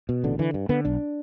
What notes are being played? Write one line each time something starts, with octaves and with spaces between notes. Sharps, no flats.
B2
A1 D3
D3 E3
G2
D3 B3
B1 D4